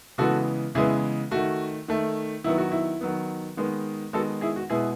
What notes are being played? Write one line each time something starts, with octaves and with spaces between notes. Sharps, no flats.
C#3 E3 G#3 B3 F#4 A4
C#3 E3 G#3 B3 E4 G#4
D#3 A3 F#4
D#3 A3
D#3 F#3 B3 E4
F#4
E4
D#3 F#3 B3
D#3 G#3 B3
D#3 G#3 B3 F#4 A4
E4 G#4
F#4
B2 G#3 B3 E4 G#4